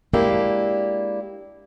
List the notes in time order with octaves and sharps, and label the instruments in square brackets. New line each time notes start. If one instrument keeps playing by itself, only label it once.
[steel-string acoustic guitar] G#3 A#3 D4 E4 G4